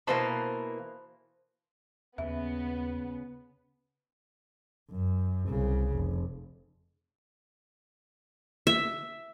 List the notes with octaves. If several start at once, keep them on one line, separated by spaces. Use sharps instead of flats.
B2 E3 A#3 C5 A5 B5
D#2 C#3 B3 E5
F#2
C2 C#3
F1
E5